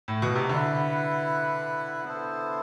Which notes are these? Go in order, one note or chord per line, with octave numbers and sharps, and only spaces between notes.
A2
B2
C3
D3 E4 B4 F#5
B3 E4 A4 C5